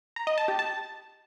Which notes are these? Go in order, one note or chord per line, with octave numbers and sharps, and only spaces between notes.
A#5
D#5
A5
G4
A5